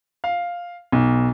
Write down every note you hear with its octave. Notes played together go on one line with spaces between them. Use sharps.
F5
B1